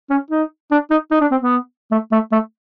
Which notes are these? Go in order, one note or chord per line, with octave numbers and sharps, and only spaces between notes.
C#4
D#4
D4
D#4
D#4
D4
C4
B3
A3
A3
A3